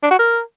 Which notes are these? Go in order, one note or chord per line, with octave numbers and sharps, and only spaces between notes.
D4
F#4
A#4